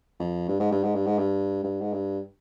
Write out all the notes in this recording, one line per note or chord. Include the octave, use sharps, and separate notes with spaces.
F2
G2
G#2
G2
G#2
G2
G#2
G2
G2
G#2
G2